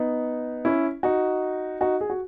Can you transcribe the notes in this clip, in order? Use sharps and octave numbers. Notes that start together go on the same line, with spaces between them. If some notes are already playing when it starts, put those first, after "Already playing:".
Already playing: B3 D#4
C#4 E4
D#4 F#4
D#4 F#4
G#4
F#4